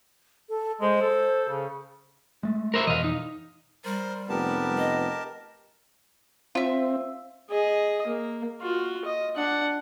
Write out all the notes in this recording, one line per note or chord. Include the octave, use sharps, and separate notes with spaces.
A4
G#3 C5
A4
C#3
G#3 A3
A#4 C5 E5
F2 B2 E3 D#5 F5
D#4
G3 A#4 C5
F1 B3 G4 A#4 A5
D#5
C4 F4 E5
G#4 D#5
A#3
F4 F#4
D#5
D4 F#5